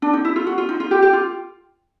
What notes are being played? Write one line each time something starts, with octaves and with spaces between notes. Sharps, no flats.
D4
D#4
E4
F4
F#4
F4
D#4
F4
G4
G4
F4